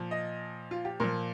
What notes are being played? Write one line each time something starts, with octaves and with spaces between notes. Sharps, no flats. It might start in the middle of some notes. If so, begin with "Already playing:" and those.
Already playing: A#2 F3
D#5
F4
G4
A#2 F3 A#4